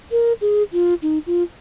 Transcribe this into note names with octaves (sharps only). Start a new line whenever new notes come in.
A#4
G#4
F4
D#4
F4